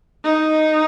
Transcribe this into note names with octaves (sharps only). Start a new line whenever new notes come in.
D#4